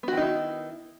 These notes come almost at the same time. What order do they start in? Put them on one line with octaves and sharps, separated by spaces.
B3 F#4 D#3 D#4 E4